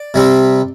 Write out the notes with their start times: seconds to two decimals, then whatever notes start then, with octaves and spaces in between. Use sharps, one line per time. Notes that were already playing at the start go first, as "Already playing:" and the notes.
Already playing: D5
0.14 C3 G3 C4